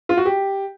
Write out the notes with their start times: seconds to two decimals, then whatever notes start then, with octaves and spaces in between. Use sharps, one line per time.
0.09 F4
0.17 F#4
0.25 G4